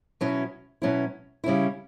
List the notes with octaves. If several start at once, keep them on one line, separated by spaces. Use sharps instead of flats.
B2 F#3 C#4 E4
B2 F#3 C#4 E4
C#3 G3 C#4 E4